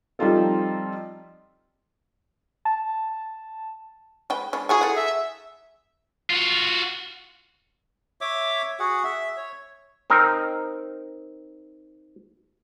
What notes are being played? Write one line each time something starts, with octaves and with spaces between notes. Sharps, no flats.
F3 G3 C4 D#4 F4 A4
A5
G#3 B4 G5
G#3 B3 D4
E4 F#4 G#4 G#5
A4 F#5
E5
F4 F#4
C#5 E5 D6
F#4 G#4 F#5
E5
C#5
C4 D#4 A#4